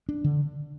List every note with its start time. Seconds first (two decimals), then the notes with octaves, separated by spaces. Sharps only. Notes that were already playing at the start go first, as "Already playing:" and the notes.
0.09 D4
0.24 D3